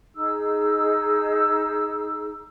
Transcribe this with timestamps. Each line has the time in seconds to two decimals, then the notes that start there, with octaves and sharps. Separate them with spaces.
0.14 D#4 G#4 E6